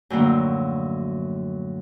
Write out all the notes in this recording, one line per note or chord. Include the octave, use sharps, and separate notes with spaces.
F#2 A2 D3 F3 F#3 A#3